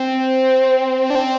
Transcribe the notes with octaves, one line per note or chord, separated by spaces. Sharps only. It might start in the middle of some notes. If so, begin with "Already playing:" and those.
Already playing: C4
D4
C4